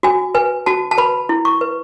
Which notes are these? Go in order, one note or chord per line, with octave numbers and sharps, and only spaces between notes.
F#4 G#5
B4 G#5
F#4 A5
A5
B4 B5
E4
C#6
B4